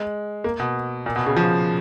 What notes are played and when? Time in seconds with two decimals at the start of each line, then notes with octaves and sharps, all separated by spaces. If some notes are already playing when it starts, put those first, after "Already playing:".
Already playing: G#3
0.44 A#3
0.59 B2
1.06 A#2
1.16 B2
1.26 C#3
1.36 F3